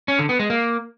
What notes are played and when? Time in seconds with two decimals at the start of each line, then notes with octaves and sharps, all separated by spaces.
0.08 C#4
0.19 D3
0.29 B3
0.39 G#3
0.50 A#3